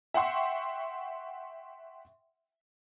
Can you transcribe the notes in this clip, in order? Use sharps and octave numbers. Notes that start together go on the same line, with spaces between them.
E5 F#5 G5 C6 C#6